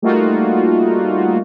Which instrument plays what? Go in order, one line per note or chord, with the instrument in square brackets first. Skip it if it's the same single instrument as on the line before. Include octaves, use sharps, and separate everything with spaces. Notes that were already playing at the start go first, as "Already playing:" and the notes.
[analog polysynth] G3 A3 A#3 D#4 F4 F#4